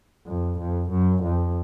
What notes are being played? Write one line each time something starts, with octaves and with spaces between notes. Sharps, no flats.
F2
F2
F#2
F2